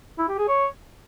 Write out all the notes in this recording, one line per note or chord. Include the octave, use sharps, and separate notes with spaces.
E4
G4
G#4
C#5